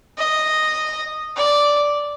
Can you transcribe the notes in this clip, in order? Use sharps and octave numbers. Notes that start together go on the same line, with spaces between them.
D#5
D5